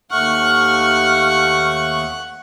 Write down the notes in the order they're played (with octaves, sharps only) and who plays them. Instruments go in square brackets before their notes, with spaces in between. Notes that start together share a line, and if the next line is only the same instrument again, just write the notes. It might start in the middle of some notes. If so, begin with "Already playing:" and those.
[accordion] D#2 A3 C#6 [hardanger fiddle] F#5 [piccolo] F6